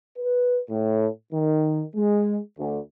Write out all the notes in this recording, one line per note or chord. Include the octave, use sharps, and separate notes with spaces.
B4
A2
D#3
G#3
D2